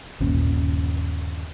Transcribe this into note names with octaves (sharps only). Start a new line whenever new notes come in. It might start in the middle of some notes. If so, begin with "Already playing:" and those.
G1 D#2 A#2 C#4